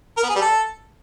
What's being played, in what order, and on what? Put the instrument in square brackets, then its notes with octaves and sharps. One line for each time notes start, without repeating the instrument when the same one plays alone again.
[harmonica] A#4
B3
G#4
G3
A4